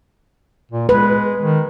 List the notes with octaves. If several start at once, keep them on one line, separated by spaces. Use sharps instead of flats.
A#2
G#3 B4
D#3